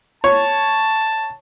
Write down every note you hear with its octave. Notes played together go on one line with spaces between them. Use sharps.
C#5 A5